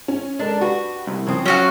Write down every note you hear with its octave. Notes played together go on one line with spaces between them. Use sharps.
C#4
G#3 D4 A4 A#4
F#4 G4 B4
C2
C#3 F3 C4 D#6
F#3 C#4 F#4 F5